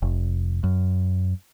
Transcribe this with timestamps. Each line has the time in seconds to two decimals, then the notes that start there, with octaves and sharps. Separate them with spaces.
0.02 F1
0.64 F#2